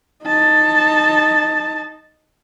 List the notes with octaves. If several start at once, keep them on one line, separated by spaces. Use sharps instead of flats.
D#4 A5